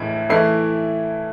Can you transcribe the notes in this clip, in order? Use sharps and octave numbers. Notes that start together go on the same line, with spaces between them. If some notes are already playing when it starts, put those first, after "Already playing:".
Already playing: A2 E3 E4 D7
E3 A3 E4 C7